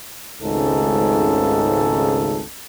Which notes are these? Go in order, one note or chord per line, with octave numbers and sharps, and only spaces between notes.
G#1 C#2 G#2 C#3 A3 A4